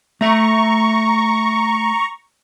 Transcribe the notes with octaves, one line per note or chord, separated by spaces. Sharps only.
A3 E5 A#5 C#6